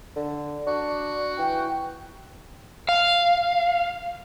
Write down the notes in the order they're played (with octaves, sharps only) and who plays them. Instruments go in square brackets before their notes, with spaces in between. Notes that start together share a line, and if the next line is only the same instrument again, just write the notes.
[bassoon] D3
[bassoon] D4 [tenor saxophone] F#4
[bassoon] E3 [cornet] G5
[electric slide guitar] F5